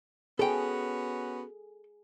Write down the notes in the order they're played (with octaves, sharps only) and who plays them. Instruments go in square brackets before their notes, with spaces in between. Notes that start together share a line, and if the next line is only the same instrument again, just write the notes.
[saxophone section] B3 C#4 F#4 [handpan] G#4 [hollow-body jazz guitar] A4 G5